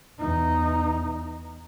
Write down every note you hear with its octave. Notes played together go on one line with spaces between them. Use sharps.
E2 D#4